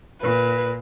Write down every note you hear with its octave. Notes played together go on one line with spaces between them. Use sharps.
A#2 B4